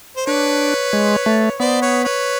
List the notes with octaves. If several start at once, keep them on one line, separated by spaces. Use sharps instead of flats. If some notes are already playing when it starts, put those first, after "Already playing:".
C5
D4 B4 C#5
G#3
A3
B3 C5 D5
B4 C#5
B4 C#5